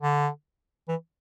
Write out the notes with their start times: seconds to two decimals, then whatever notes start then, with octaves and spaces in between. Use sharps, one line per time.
0.01 D3
0.89 E3